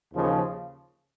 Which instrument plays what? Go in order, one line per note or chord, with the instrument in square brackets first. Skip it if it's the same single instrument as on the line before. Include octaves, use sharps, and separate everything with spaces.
[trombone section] D#2 C#3 F3